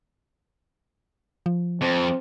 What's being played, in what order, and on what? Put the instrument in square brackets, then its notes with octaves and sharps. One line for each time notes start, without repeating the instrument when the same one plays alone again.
[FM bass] F3
[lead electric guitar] F2 [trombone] C4